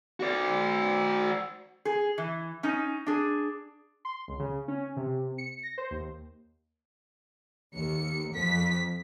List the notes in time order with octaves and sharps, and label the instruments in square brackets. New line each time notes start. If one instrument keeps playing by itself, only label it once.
[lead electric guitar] F#4 D5
[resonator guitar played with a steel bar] G#4
E3
C#4 D#4
D4 G#4
[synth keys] C6
C#2
C#3
C#4
C3
C#7
A#6
C5
D#2
[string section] D#2 C#7
F2 F3 B6